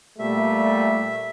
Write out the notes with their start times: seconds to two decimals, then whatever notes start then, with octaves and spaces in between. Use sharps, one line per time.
0.19 A#2 G3 A3 E5